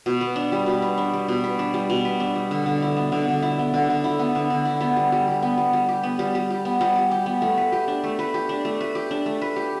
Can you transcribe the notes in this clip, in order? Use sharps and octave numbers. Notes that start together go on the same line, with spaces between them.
B2
B4
D4
G3
B2
B4
D4
G3
B2
B4
D4
G3
B2
B4
D4
G3
D3
D3
E4
B3
D3
D3
E4
B3
D3
D3
E4
B3
D3
D3
E4
B3
G3
G3
G4
B3
G3
G3
G4
B3
G3
G3
G4
B3
G3
G3
G4
B3
A3
B4
G4
D4
A3
B4
G4
D4
A3
B4
G4
D4
A3
B4
G4